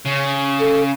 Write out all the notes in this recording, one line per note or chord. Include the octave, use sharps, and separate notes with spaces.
C#3
A4